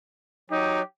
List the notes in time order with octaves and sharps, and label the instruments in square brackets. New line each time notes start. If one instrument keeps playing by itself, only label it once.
[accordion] F#3 [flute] D#4 [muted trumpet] G4